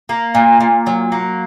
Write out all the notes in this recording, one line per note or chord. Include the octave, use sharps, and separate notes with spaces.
A#3
A#2
A#2
F#3
A#3